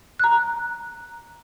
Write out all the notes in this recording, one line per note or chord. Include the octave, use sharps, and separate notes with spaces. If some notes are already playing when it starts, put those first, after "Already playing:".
A#5 F#6